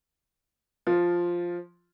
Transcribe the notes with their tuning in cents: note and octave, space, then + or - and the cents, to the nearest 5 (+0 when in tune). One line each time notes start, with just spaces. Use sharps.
F3 +0 F4 +0